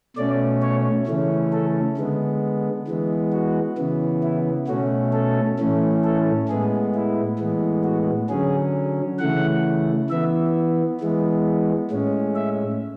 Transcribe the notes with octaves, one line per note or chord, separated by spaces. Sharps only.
B2 A3 C#4 D5
C#5
C#3 E3 A3 C#4
A4
D3 G#3 B3
E3 G#3 B3
F#4
C#3 E3 B3
E4
B2 A3 C#4 F#4
A4
A2 E3 A3 C#4
A4
A2 G#3 B3 G#4
E4
A2 E3 G#3 B3
F#4
D3 F#3 C#4 G#4
C#3 E3 A3 F#5
E3 B3 E5
E3 G#3 B3
A2 G#3 C#4
E5